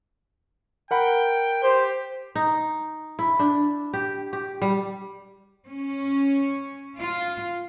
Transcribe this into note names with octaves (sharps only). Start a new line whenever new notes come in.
A#4 F#5 G5 B5
G4 C5
D#4
E4
D4
G4
G4
G3
C#4
F4